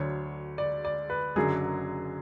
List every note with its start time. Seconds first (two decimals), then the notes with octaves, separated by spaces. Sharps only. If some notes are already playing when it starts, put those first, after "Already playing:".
Already playing: D2 D3 F#3 C#5
0.58 D5
0.85 D5
1.10 B4
1.35 F#1 F#2 D3 F#3 G#4